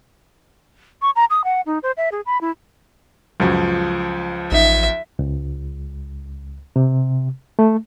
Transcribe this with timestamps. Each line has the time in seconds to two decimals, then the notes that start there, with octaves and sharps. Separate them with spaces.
1.02 C#6
1.16 A#5
1.30 D#6
1.44 F#5
1.66 D#4
1.83 C5
1.97 E5
2.12 G#4
2.26 B5
2.41 E4
3.40 C#2 F#2 F3
4.52 A1 D#4 E5
5.19 C#2
6.76 C3
7.59 A3